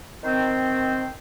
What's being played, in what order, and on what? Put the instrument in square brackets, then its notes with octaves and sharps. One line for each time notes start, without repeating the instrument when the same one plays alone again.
[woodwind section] D#3 C4 C5